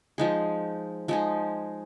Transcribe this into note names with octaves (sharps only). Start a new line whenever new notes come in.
F3 G#3 D#4 G#4
F3 G#3 D#4 G#4